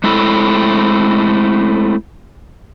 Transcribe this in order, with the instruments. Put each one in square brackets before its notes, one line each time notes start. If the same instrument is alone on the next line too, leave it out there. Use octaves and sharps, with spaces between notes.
[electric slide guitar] G#3 A3 C4 E4 A4